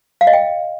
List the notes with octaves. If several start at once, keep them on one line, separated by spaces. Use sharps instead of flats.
F5
D#5
G5